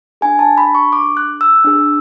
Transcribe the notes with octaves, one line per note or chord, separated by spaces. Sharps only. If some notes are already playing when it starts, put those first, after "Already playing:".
D4 G#4 G#5
A5
B5
C#6
D6
F#6
E6
D4 G#4